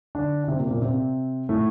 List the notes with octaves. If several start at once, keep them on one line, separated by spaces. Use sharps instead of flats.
D3 D4
D4
C3 C4
A#2 A#3
A#2 A#3
C3 C4
A2 A3